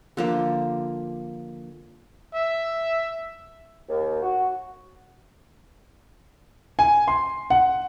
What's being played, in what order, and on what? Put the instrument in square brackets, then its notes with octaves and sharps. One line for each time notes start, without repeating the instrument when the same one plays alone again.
[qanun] D3 F3 A#3
[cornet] E5
[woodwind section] D#2
F#4
[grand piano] G#5
C6
F#5